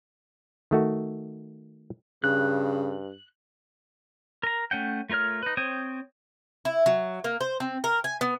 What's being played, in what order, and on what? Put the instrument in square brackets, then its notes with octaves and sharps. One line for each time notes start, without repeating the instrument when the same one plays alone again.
[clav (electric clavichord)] D#3 A3 F#4
[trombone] G2 [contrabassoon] C#3 [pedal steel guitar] F#6
[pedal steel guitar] A#4 A#5
A3 C#4 F#5 G5
A3 F4 A#4 C#5 F6
D#4 B4
C4 C5 C#5 G5 D#6
[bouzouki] E4
F#3
A#3
C5
C4
A#4
G#5
B3